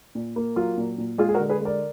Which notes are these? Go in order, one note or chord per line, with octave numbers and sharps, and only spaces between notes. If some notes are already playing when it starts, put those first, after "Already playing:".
A#2
A#3
F#3 F4
A#2
A#2
G#3 F4 G#4
G#4
F#4 A#4
D3
G#4 B4
G#3 A#4 D5